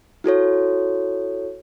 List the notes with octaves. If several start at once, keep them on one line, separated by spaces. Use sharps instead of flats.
E4 F#4 A4 C#5